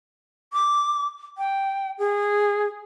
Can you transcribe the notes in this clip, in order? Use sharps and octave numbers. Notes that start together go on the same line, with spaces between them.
D6
G5
G#4